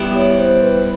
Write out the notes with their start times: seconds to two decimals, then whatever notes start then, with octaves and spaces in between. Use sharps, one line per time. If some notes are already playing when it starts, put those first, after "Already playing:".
Already playing: G3 B3 E4 G4
0.13 C#5
0.37 C5
0.61 B4